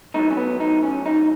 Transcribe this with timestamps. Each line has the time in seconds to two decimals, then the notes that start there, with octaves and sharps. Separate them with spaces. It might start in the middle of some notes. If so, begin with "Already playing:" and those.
0.14 A2 F#3 D#4
0.31 C#4
0.37 B3
0.60 D#4
0.83 C#4
1.06 D#4